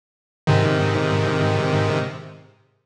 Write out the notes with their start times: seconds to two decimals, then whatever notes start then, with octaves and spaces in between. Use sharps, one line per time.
0.47 G#2 C3 D#3